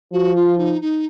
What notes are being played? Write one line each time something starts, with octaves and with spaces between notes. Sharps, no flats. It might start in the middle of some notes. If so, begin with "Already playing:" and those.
F3 F#4
F4
D#4
D#4